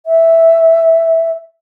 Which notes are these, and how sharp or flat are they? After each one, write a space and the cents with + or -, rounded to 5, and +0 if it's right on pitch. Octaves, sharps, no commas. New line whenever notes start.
E5 -5